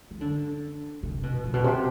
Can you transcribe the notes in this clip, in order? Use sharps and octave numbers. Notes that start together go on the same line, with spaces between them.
D#3
D3
C3
B2
A#2
B2
C3